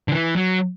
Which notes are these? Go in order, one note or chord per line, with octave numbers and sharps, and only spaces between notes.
D3
E3
F#3